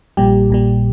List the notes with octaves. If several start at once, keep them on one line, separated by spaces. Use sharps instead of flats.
A#1 A#2 G3 G4
A#1 A#2 G3